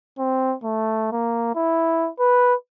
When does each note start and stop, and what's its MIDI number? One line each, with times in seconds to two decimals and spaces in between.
0.19 0.55 60
0.63 1.11 57
1.12 1.52 58
1.55 2.09 64
2.20 2.54 71